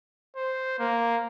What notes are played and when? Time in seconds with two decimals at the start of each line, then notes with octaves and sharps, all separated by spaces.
0.36 C5
0.79 A#3